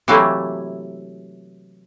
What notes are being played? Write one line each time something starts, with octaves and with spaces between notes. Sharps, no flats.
C3 E3 F#3 A3 A#3 E4